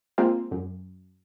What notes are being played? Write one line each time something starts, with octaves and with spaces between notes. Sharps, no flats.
G#3 A#3 C4 F4
F#2